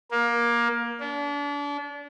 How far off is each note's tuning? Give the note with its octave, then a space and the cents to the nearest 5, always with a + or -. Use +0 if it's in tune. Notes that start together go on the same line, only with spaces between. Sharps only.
A#3 +20
D4 -35